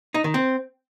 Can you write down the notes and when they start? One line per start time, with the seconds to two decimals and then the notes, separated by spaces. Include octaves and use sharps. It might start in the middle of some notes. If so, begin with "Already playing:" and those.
0.14 D#4
0.24 D#3
0.34 C4